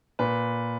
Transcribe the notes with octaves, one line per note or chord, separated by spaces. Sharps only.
A#2 B4